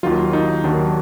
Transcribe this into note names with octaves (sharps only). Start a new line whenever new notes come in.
D#2 D#3 F#3 F4
D#4
D#2 D#3 F#3 D4